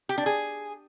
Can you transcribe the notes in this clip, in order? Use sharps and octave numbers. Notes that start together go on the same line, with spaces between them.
G4
D4
G#4